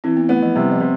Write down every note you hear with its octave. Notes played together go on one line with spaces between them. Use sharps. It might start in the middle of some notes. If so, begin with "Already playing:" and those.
E3 C4
B3
A3 B3
F3
C3 G3
F3
C3